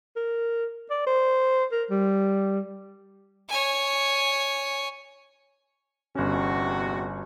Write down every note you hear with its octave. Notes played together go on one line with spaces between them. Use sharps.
A#4
D5
C5
A#4
G3
C#5 G#5
G1 E2 C3 C#4 F#4